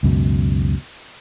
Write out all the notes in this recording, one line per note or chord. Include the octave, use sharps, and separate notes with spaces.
C#2 F#2 B2